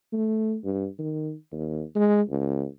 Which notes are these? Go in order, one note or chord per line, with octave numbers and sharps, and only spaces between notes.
A3
G2
D#3
D#2
G#3
C#2